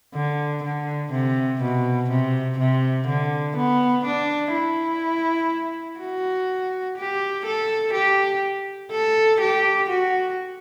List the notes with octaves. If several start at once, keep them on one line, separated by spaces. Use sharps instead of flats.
D3
D3
C3
B2
C3
C3
D3
B3
D4
E4
F#4
G4
A4
G4
A4
G4
F#4